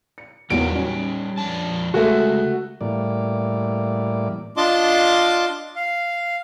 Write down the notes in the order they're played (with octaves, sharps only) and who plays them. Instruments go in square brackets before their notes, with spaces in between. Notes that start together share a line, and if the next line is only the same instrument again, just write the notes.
[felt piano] C#7
[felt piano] E2 F#3 A#3 [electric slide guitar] G3 D#4 G4 [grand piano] D7
[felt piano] C#4
[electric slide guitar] F2 D4 A5
[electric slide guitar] C#3 G#3 [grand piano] A3 F#4 [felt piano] G#4
[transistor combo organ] A2 E3 G3 A#3 D5
[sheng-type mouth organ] D4 F4 D#5 A5 C6 D6
F5